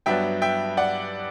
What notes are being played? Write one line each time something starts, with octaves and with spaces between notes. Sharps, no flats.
G2 F#3 B3 D4 E5 G5
E5 G5
D5 F#5